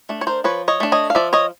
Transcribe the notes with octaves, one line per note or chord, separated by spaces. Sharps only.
A3 D4
C#5
A#4 C5
F3 B4 C#5
C#5 D#5
A3 D4
C#5 D#5
F5
F3 D5 E5
C#5 D#5